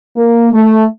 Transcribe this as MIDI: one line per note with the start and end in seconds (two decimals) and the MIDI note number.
0.17 0.52 58
0.53 0.84 57